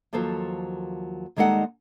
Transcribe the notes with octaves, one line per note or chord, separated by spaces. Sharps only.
D#2 F3 F#3 A4 C5
D#2 G3 G#3 D#4 A4 F#5